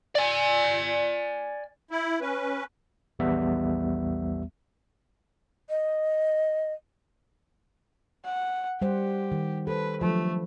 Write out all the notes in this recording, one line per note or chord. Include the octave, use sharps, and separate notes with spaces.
D5 G#5
E4
C#4 B4
A#1 E2 G3 B3 E5
D#5
F#5
G3 G4 C5 F#5
D#3
A4 B4 C5
F3 F#3 A3 D4